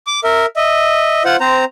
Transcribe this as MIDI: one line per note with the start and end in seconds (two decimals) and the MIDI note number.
0.07 0.20 86
0.24 0.46 70
0.24 0.46 76
0.56 1.23 75
0.56 1.23 76
1.25 1.36 65
1.25 1.36 72
1.25 1.36 78
1.40 1.65 60
1.40 1.65 72
1.40 1.65 82